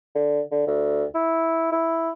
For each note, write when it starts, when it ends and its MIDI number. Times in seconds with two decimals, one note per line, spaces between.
0.15 0.40 50
0.51 0.63 50
0.67 1.04 38
1.14 1.67 64
1.72 2.10 64